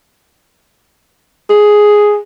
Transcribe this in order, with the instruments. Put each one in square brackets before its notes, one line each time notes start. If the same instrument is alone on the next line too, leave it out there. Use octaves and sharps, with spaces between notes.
[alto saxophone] G#4